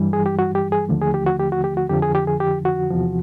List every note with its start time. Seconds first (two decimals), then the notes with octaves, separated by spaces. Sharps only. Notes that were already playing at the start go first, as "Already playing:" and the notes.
Already playing: G2 E3 G3
0.13 G#4
0.26 G4
0.39 F#4
0.55 G4
0.72 G#4
0.89 D#2 D3 F3 A3
1.01 G#4
1.14 G4
1.27 F#4
1.40 G4
1.52 F#4
1.64 G4
1.77 F#4
1.90 F2 D3 F3 G4
2.02 G#4
2.15 G4
2.27 G#4
2.40 G4
2.65 F#4
2.90 E2 C3 F3